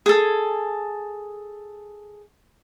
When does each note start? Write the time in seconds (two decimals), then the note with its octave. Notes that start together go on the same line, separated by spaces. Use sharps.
0.06 G#4 A4